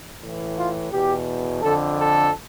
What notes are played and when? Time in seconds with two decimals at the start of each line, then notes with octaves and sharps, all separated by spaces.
0.22 A2 E3
0.57 F4
0.92 E2 B2 G4
1.62 F2 D3 A4
1.98 A4